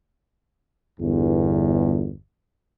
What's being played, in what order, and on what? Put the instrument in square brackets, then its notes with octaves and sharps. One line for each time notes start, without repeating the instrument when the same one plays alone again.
[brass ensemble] G1 E2